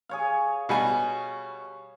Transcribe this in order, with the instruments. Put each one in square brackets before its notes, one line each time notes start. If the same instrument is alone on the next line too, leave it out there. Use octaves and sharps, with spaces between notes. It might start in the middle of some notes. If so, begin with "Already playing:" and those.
[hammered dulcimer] G#4 C#5 F5
[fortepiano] B2 G3 G#5